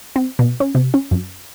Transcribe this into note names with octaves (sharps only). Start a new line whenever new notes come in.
C4
B2
C#4
C3
C#4
F#2